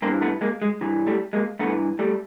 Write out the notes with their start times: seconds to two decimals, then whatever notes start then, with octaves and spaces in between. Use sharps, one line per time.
0.02 G2 A#3 C4
0.07 E3
0.21 A3 B3
0.41 G#3 A#3
0.62 G#3
0.81 G2 E3
1.07 G3 A3
1.33 G#3 A#3
1.59 G2 E3 A3 B3
1.99 G3 A3